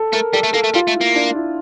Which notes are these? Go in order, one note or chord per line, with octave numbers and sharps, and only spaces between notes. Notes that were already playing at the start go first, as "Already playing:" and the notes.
Already playing: A4
A3 A#4
G3 A4
A3
A#3 A4
A3
G3 F4
A3
E4
A#3
D4
E4